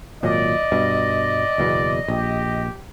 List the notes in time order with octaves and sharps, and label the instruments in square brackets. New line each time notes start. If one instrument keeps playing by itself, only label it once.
[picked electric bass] G#1 A#2 F#3 [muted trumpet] D5 [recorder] D#5
[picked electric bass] G2 B2
F#1 E2 B2
[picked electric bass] A#1 [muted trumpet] G4